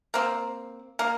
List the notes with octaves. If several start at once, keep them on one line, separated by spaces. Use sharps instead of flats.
A#3 C4
A#3